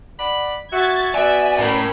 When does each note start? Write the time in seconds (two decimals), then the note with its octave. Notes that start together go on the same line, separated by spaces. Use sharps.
0.19 D5 F#5 B5
0.72 F#4 E5 G#6 A6
1.15 B3 F#4 D5 E5 G#5
1.59 A2 C#4 A#4 B5